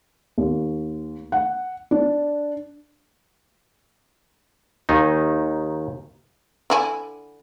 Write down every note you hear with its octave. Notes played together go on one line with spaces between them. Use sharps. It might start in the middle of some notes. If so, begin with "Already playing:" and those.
D#2
F#5
D4
D#2 D#3 D#4
D3 E4 G#5